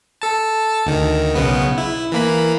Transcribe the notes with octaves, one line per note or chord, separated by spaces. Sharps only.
A4 A5
D2 D#3
B1 C#3 B3
E4
E3 A#3 B5